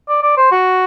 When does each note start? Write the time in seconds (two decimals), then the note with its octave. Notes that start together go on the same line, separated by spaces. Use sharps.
0.09 D5
0.23 D5
0.37 C5
0.52 F#4